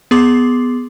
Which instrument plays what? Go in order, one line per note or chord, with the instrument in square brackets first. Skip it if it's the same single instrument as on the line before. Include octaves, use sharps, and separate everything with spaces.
[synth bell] B3 G#4 C6 D6 C7